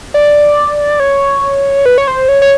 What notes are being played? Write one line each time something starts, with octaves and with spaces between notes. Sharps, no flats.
D5
C#5
B4
C#5
C5
C#5
C#5